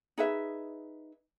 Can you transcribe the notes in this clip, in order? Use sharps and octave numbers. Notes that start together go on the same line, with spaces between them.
D#4 G#4 B4 E5